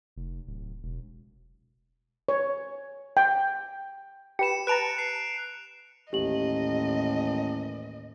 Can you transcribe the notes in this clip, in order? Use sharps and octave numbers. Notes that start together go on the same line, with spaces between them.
F1
D1
E1
C#5
G5
G4 B4 C#7 E7
B4 A5 A#5 F#6 D7 F7
C7
A1 D#2 A2 G4 D#5 F#7